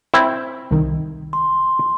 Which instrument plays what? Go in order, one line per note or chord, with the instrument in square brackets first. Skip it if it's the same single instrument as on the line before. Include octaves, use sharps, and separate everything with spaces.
[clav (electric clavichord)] C4 E4
[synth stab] C2 D#3
[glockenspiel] C6